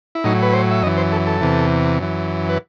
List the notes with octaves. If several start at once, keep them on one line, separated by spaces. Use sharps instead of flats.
E4
A2 F#3 D#4
B4
C5
E5
F#2 E3 D#5
C5
A4
A4
E2 C3 E3
F#2 E3
B4